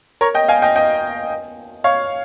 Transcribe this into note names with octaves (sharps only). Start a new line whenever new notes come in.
A#4 C#5
D#5 G5
F5 G#5
D#5 G5
D#5 G5
C#5 F5